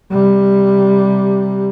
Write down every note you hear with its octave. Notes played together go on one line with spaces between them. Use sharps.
C3 G3